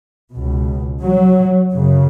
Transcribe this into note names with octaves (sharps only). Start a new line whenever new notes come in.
C#2 B2
F#3
F#2 C#3